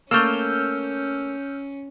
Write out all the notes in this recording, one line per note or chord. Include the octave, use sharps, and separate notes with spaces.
A3 A#3 C#4 E6 F6 G6